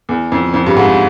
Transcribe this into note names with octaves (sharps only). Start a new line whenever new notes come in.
E2
F2
F2
G2
G#2